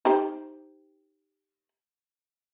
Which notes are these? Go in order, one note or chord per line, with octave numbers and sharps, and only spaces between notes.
D#4 G4 C5